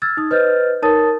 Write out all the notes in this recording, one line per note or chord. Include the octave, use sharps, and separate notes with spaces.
E6 F6 G#6 A6
D#4 D#6
B4 C5 D#5 F6 G6 A6
D#4 A#4 C#5 A5 D#6 A6